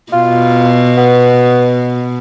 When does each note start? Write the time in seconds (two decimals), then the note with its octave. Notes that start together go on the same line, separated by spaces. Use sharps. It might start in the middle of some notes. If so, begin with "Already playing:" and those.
0.13 B2 F4
0.97 B3